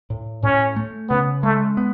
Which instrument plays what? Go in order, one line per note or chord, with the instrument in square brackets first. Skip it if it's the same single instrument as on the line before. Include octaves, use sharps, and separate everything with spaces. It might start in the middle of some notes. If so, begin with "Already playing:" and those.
[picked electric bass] A2
[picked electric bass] A2 [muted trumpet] C#4
[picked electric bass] A3
[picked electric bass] C#3 [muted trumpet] B3
[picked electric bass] G#3 [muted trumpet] A3
[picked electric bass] B3